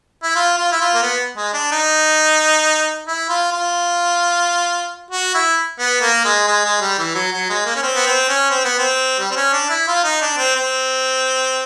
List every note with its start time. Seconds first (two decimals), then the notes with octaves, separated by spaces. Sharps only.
0.23 E4
0.35 F4
0.58 F4
0.72 E4
0.81 F4
0.94 A#3
1.03 B3
1.37 G#3
1.54 D4
1.72 D#4
3.07 E4
3.29 F4
3.52 F4
5.11 F#4
5.34 E4
5.79 B3
6.01 A#3
6.25 G#3
6.48 G#3
6.65 G#3
6.81 G3
6.99 E3
7.15 F#3
7.32 F#3
7.49 G#3
7.65 A#3
7.76 C#4
7.83 C4
7.95 B3
8.06 C4
8.29 C#4
8.50 C4
8.65 B3
8.78 C4
9.19 G3
9.31 C4
9.36 C#4
9.53 D4
9.69 E4
9.88 F4
10.04 D#4
10.22 D4
10.37 C4
10.56 C4